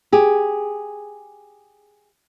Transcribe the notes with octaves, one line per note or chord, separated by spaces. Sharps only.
G4 G#4